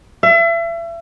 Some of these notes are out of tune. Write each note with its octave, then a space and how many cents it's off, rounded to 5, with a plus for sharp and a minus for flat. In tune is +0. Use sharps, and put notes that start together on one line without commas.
E5 +35